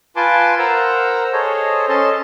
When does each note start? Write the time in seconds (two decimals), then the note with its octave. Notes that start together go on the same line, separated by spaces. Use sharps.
0.16 F4 B4 G#5 A5 C6 D6
0.59 A#4 C5 F#5 A#5 E6
1.33 G#4 A4 C5 C#5 D#5
1.89 C#4 A4 D#5 A5 C6